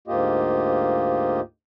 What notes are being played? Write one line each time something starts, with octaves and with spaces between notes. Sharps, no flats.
D2 G#2 A#3 F4 G4 D#5